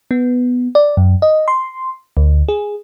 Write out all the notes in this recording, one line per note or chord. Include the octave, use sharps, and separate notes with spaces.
B3
D5
F#2
D#5
C6
D2
G#4